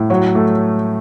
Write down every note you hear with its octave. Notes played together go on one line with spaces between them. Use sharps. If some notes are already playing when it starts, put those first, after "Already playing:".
Already playing: A2
F#3 C#5
A3